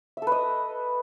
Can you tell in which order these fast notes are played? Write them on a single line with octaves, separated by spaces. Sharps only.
E5 A4 B4 D#5